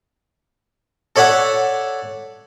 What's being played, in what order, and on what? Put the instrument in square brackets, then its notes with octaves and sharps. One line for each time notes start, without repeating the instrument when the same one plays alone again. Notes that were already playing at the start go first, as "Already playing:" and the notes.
[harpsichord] A4 C#5 D5 E5 F#5 A5